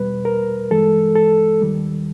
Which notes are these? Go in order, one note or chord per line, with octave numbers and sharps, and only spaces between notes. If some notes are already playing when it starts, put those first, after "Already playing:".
Already playing: E2 B2 G3 B4
A#4
G2 E3 G#3 A4
A4
D#2 D#3 G3